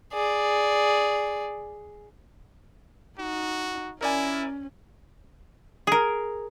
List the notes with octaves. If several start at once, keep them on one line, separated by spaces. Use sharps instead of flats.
G#4 D5
D#4 F#4
C#4 E4 A#4 D5 G#5
G#4 A#4